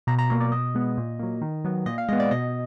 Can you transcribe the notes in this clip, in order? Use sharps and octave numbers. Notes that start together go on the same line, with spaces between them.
B2 A#5
A#5
F#3 A#3 A#5
D5
B2 D#5
G#3 B3
A#2
F#3 A#3
D#3
F#3 B3
A#2 D#5
F5
G#3 B3 D#5
D5
B2 D#5